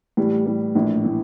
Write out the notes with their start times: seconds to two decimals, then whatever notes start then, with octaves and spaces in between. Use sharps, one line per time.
0.17 A2 E3 G3
0.46 A2 E3 G3
0.75 A#1 A2 E3
1.05 A2 E3